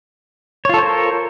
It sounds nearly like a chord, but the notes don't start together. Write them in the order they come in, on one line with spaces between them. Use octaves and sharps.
C#5 F4 A4 C5 A#4